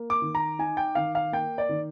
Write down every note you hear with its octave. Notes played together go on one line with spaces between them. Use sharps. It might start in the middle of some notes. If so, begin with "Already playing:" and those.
Already playing: A#3
D6
D#3
A#5
D#4 G#5
G5
D#3 F5
F5
A#3 G5
D5
D#3